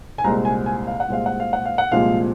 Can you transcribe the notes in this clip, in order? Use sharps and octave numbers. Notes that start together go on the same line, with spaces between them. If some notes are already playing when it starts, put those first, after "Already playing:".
G#5
C2 A#2 G#3 C4 A#5
G#5
G#5
F5
F#5
C2 A#2 G#3 C4 F5
F#5
F5
F#5
F5
F#5
C2 A#2 F3 G#3 C4 F5